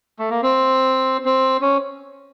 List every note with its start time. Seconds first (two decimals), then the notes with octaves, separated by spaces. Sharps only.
0.19 A3
0.30 A#3
0.42 C4
1.25 C4
1.61 C#4